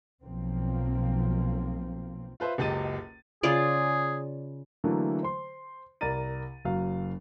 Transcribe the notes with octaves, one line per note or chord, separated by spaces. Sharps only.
B1 F3 A#3 C4
F4 B4 C5 E5
F#1 C#2 G4 D#5 A6 D#7
C#3 F4 G#4 D5
D3 E3 F#3 A3 A#3
C5 C6
C2 A#4 D5 A#5 A6 D#7
F#1 F#3 F5